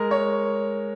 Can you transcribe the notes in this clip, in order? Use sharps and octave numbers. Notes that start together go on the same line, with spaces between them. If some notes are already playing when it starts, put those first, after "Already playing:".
Already playing: G#3 A#4
C#5